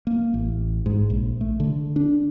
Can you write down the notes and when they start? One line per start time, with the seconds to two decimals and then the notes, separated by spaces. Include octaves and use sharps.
0.07 A#3
0.34 A1
0.86 G#2
1.10 A#1
1.41 A3
1.60 D3
1.96 D4